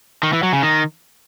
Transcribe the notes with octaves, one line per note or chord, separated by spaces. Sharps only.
D#3
E3
F#3
C#3
D#3